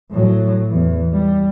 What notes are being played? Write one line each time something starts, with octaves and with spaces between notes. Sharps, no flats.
A2 F#3
E2 E3
G3